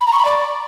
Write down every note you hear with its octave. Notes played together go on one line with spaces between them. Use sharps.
B5
A#5
C#6
B5
D5